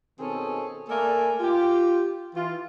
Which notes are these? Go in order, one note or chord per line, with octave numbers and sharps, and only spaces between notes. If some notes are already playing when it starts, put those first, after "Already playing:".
B2 D#3 C4 C#4 G#4 A4
A3 A#3 A4 A#4 D5 G#5
F4 G4
E3 F4